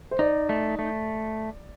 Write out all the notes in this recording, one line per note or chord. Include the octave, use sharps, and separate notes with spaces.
C5
D#4 D5
A3
A3